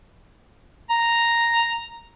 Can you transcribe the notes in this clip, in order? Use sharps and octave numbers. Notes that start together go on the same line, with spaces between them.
A#5